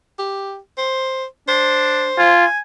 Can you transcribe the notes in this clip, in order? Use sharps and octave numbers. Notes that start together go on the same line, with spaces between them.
G4
C5
D4 C5
F4 G#5